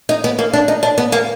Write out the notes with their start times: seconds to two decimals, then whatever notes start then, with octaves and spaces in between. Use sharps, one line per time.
0.09 D#4
0.24 B3
0.39 A#3
0.53 D4
0.68 D#4
0.83 D4
0.98 B3
1.12 A#3